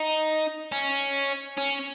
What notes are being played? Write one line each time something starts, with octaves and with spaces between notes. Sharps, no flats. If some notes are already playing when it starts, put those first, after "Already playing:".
Already playing: D#4
C#4
C#4